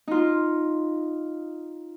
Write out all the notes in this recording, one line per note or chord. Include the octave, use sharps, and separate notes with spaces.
D#4 F4